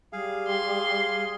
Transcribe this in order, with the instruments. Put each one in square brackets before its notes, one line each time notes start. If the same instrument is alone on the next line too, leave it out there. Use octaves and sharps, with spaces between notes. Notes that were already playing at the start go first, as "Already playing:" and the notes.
[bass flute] G3 [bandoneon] G#4 F5
[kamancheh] C6